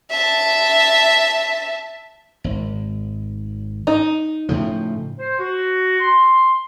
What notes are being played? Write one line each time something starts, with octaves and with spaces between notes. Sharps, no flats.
E5 A5
G#1
D#4
A2 C#3 F3
C5
F#4
C6